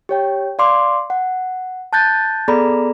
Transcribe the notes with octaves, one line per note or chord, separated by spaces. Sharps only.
G4 C#5 G5
D5 F5 C6 D6
F#5
A5 F#6 G6 A6
B3 G#4 A4 D5 A#5 B5